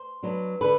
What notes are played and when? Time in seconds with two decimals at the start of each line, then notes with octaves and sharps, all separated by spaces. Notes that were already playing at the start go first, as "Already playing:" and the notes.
Already playing: C5
0.23 F#3 B3 D4
0.61 D3 B4